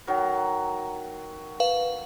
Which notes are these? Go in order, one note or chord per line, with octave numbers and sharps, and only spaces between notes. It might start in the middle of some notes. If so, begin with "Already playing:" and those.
D#3 F#3 A#4
B4 F5